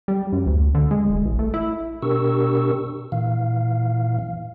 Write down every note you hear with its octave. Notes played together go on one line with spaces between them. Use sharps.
G3
F#2
D2
D3
G#3
E1
A1
A3
E4
B2 D4 G4 A#4 C#6 E6
A#2 E3 F5